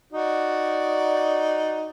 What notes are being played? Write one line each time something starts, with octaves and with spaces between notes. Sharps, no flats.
D#4 F#4 D5